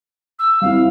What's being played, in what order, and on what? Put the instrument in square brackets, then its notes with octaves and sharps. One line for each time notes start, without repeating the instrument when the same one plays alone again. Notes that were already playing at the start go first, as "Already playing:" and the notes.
[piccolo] E6
[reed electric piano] G3 C4 E4 [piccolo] F5